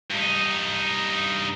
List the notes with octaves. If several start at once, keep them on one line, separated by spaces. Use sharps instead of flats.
G2 D#4